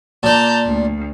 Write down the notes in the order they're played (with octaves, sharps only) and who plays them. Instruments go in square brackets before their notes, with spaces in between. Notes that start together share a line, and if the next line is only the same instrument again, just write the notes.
[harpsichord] A#2 D5 [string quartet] A5 A#5 G6
[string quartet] D2